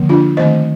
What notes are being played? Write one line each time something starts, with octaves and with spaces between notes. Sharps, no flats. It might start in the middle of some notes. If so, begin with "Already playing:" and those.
Already playing: D3 F3 A#3
D4 F4
D#3 A3 C4 C5 D#5